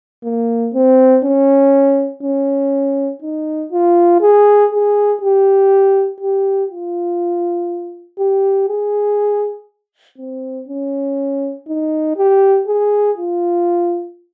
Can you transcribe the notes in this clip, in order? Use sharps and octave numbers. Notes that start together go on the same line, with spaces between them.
A#3
C4
C#4
C#4
D#4
F4
G#4
G#4
G4
G4
F4
G4
G#4
C4
C#4
D#4
G4
G#4
F4